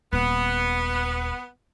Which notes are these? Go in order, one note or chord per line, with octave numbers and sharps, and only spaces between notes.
D#1 B3